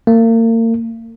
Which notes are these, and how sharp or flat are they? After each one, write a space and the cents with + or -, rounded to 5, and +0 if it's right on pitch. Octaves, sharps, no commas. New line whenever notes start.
A#3 -40